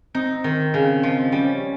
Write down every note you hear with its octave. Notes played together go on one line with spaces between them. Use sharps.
C4 D#4
D#3
C#3
F3
G3 C#4